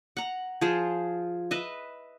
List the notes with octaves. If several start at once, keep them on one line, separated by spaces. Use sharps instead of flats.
F#5 A#5
F3 F4 G#4 C5
B4 D#5 E5